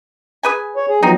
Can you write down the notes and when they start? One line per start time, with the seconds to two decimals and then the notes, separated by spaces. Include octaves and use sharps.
0.43 G#4 B4 G#5
0.76 C#5
0.89 G#4
1.03 F3 F#3 B3 C4 D#4